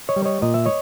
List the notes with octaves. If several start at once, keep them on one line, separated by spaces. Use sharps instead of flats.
C#5 D#5
G3
C#5 D#5
A#2 D#5
E5
C#5 D#5